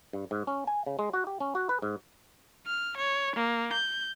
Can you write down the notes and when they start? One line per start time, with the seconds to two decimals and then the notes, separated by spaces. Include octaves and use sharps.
0.13 G2
0.31 G#2
0.47 C#4
0.67 G#5
0.86 C#3
0.99 G#3
1.13 F#4
1.27 G4
1.40 C#4
1.55 F#4
1.69 B4
1.82 G#2
2.66 F6
2.97 C#5
3.36 A#3
3.73 G6